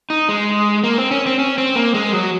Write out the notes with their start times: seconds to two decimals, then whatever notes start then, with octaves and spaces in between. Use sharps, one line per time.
0.10 D#4
0.29 G#3
0.84 A#3
0.98 C4
1.11 C#4
1.26 C4
1.39 C#4
1.58 C4
1.76 A#3
1.94 G#3
2.13 F#3